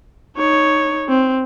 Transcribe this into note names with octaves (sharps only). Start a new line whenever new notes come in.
D#4 C#5
C4